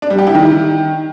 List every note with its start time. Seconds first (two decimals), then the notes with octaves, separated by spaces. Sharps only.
0.02 D4
0.10 G3
0.18 G4
0.27 E4
0.35 D#3